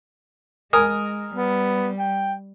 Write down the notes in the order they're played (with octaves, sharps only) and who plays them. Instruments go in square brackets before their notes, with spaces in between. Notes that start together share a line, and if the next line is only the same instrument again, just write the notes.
[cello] G#3 [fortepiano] A#4 G#5 D#6
[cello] G3 [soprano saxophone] B3
[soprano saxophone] G5